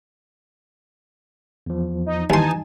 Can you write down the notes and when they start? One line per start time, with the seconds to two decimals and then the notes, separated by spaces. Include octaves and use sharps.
1.66 E2 F3
2.06 D#4
2.30 D#2 E3 D#4 G#5 A5 C6